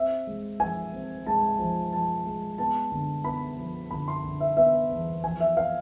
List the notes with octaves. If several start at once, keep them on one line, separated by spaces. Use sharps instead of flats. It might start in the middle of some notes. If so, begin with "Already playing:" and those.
Already playing: C4 E5
G#3
F3 G#5
C4
G#3 A5
F3
F3 A5
G#3
B3 A5
D3
B3 B5
F3
D3 B5
C6
D3
E5
B3 E5
E2
F3 G#5
E5
F5